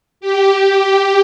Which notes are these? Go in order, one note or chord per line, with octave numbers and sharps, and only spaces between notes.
G4
G4